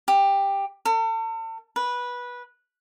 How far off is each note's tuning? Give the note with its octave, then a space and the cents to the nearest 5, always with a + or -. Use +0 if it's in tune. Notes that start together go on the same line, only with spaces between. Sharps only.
G4 +10
A4 +40
B4 -15